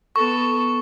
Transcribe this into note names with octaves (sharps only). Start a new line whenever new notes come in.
B3 A4 C#6